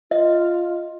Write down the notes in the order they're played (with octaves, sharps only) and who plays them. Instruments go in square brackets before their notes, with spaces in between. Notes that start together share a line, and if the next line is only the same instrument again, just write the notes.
[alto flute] F4 [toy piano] D#5